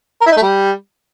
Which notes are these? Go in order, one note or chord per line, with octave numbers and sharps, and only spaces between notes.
A#4
E4
D#4
A3
G3